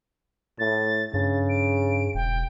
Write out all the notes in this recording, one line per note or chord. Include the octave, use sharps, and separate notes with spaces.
A2 A6
G2 C#3 A6
D7
E1 G5